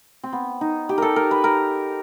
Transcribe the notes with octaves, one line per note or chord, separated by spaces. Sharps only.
C4
B3
D#4
G4
A4 A#4
A#4
B4
A#4